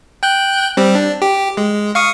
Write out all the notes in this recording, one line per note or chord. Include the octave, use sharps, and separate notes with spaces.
G5 F#6 G6
G3 C4
D4
G4
G#3
F5 C#6 D#6